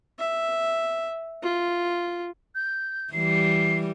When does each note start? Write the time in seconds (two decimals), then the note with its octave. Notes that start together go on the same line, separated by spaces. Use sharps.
0.19 E5
1.43 F4
2.55 G6
3.13 E3 G3 C7